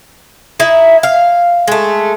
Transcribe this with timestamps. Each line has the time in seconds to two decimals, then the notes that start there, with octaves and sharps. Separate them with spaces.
0.60 D#4 E4 E5
1.03 F5
1.68 G#3 A3